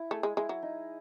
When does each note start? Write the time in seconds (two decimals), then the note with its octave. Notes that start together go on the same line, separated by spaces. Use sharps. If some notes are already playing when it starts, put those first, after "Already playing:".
Already playing: E4
0.11 A3 G#4
0.23 G#3
0.37 G#3 E4
0.49 F#3
0.62 D#4